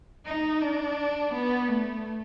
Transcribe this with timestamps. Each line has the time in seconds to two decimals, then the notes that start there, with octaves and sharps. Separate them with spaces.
0.26 D#4
0.61 D4
1.33 B3
1.69 A3